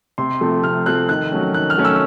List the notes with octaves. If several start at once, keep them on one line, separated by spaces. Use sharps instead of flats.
C3 C6
F3 A3 C4
C3 F6
F3 A3 C4 F#6
D#3 F#6
F#3 A3 C#4
D#3 F#6
F6
F#3 A3 C#4
E6